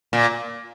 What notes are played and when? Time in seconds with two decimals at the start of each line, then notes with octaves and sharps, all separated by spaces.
0.13 A#2